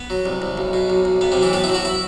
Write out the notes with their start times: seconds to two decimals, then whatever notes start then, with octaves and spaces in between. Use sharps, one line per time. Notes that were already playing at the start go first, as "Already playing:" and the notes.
Already playing: B3
0.10 F#3
0.26 C2
0.42 C2
0.58 B1
0.73 B2
0.90 B1
1.05 B1
1.21 B1 B3
1.32 C3 C4
1.37 B1
1.42 E3 E4
1.53 A2 B3 B4
1.64 E4 E5
1.69 F#3
1.75 F#4 F#5
1.85 E4 E5